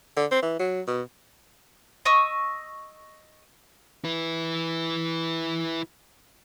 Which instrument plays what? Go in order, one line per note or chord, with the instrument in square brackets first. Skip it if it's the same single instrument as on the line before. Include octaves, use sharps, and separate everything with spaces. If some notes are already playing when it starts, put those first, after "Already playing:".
[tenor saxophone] D3
C4
E3
F#3
B2
[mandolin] D#5 C#6 E6
[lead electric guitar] E4 B4